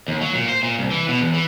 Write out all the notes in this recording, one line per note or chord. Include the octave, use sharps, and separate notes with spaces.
D#2
F#3
A#2
C5
A#2
C2
E3
B2
E2
E3